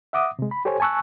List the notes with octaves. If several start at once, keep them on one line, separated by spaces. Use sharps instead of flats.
E5 F#5 D6 D#6
C3 G#3
B5
G4 A4 C5 C#5 G#5
G#5 A5 C#6 E6 F#6